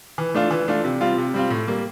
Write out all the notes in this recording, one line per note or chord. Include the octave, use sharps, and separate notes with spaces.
E3
A3 D4 F4
E3
A3 D4 F4
C3
G3 C4 F4
C3
G3 C4 F4
A2
G3 A#3